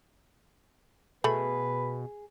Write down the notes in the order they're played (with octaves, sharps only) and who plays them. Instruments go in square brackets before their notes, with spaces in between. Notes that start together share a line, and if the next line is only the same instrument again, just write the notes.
[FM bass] B2 [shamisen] A3 B5 [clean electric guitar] G#4 [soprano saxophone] B4